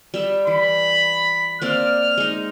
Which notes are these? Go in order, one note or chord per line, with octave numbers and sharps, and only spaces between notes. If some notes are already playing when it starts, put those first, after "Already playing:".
G3 G4 E5
E3 B5
A#3 C4 D5 F6
G#3 D#4